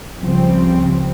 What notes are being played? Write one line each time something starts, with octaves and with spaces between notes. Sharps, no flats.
C#2 C#3 F3 G3 C4